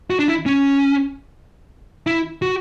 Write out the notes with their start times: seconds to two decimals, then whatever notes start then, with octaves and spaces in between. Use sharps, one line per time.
0.10 F#4
0.19 D4
0.28 E4
0.46 C#4
2.07 E4
2.42 F#4